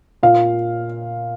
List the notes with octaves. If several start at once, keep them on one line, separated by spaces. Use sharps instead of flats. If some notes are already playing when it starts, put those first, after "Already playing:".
A#2 F5